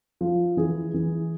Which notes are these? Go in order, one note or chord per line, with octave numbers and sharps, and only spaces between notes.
F3
E3 G#4
E3